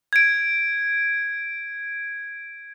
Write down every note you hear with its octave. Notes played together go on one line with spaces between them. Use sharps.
G#6 D7